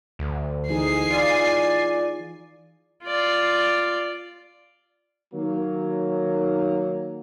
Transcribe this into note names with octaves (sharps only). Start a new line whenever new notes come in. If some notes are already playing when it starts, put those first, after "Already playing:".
D2
E3 D#4 G#4 G#5 C7
F4 D5
F4 D5
D#3 F#3 A#3